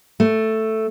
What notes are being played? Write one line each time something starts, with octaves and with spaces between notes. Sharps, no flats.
A3